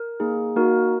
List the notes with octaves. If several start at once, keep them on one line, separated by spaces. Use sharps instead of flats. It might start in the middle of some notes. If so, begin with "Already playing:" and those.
Already playing: A#4
A#3 D#4 G#4
A#3 D#4 F#4 A#4